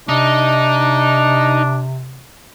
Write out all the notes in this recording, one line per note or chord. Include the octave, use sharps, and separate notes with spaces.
C3 D4 D#4